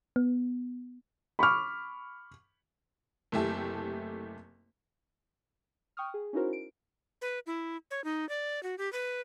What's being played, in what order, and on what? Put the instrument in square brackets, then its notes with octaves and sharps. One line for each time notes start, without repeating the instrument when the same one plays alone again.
[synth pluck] B3
[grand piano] B5 C#6 D6 F6
[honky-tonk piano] F#1 C3 A3 E4 G4 A5
[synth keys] G5 C#6 D#6 F6
G#4
C#4 D#4 E4 F#4 A#4 C5
D7
[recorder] B4
E4
C#5
D#4
D5
F#4
G4
B4